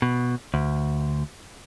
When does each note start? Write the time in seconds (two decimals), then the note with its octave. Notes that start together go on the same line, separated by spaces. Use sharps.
0.02 B2
0.54 D2